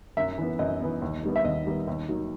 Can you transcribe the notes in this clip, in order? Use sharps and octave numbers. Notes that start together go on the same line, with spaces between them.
F#2 E5
E3 B3
F#2 D#5
E3 B3
D#2
D#3 G3 B3
E5
D#2 D#5
D#3 G3 B3
D#2
D#3 F#3